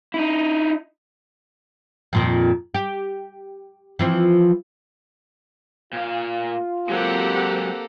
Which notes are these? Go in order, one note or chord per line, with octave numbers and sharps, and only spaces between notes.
D#4 E4
F2 A#2 D#3
G4
E3 F3 C4
A#2 F4 F5
F#3 G#3 A#3 C4 G4 A4 F#5